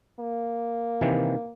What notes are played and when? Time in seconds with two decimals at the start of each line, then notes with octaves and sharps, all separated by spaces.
0.19 A#3
1.01 C3 D#3 E3